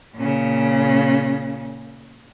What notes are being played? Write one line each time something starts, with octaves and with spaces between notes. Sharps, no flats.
A#2 C#3